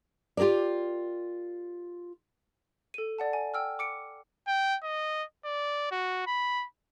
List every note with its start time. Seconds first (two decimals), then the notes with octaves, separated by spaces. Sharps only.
0.37 F4 G4 G#4 A#4 D5
2.94 A4 D#7
3.19 D5 F#5 A5
3.33 G#5
3.54 G5 E6 F6
3.79 D6 C#7 D7
4.48 G5
4.84 D#5
5.45 D5
5.92 F#4
6.27 B5